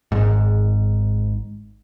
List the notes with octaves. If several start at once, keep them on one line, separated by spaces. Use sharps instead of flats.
G#1 G#2